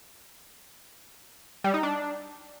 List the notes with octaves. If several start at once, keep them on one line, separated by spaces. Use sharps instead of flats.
G3
D#4
D4